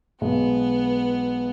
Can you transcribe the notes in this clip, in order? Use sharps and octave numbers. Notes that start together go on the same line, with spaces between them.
B1 B2 G#3 B3